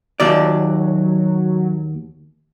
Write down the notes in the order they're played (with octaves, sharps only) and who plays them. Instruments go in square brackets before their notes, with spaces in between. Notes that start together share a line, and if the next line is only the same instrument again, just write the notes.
[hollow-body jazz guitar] D#2 D5 [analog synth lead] F#3